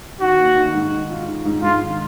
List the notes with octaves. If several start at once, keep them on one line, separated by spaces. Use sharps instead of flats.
D#3 F#4
A#3
D#3
G#2
D#3
F4
D#3
G#2
G#2 F4
D#3